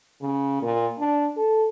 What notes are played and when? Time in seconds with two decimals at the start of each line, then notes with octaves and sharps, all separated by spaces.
0.22 C#3
0.62 A#2
0.99 D4
1.37 A4